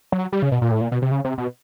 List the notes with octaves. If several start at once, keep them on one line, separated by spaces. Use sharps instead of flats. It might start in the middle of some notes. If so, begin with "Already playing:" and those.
F#3
G3
C#3
B2
A#2
A2
A#2
B2
C3
C#3
C3
B2